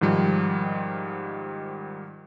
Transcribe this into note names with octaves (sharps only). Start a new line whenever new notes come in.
G#2 D#3 F3 G3